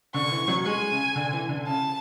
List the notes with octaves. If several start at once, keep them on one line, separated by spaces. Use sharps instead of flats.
D3 C#6
E3
F#3
G#3 G#5
C#3
D3
E3
D3
C#3 A5